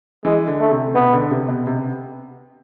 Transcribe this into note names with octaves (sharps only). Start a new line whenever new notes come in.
E3 G#3
D3
A3
C3
B2 B3
D3
C3
B2
C3